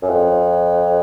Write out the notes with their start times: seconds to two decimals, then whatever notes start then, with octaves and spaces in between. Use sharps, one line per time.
0.02 F#2
0.09 F2